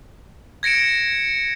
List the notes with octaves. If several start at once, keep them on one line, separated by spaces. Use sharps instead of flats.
G#6 A#6 C#7 D7 E7